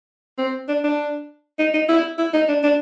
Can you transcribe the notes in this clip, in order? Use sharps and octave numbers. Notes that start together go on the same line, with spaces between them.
C4
D4
D4
D#4
D#4
E4
E4
D#4
D4
D4